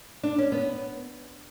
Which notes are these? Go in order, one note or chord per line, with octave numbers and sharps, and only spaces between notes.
D4
C#4
B3